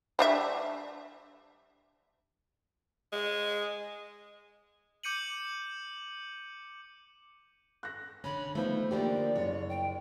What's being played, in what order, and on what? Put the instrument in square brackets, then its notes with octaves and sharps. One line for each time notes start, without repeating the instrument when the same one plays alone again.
[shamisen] G3 D4 E5
[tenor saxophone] G#3
[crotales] D6 G6 C#7 D#7 F#7
[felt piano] F#6 A#6
[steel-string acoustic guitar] D3 C#4 [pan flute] B5
[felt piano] D#3 F3 B3 [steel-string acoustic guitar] A3 [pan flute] C5
[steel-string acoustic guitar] D3 F3 A#3 [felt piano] G4 G5 [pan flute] D5
[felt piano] F#1 [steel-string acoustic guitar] C#5
[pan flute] G5